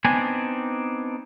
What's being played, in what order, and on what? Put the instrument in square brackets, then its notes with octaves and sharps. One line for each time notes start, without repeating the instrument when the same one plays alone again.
[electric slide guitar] B3 C4 D4 D#4 G#5